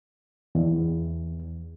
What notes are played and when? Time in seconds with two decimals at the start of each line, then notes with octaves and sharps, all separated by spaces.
0.55 E2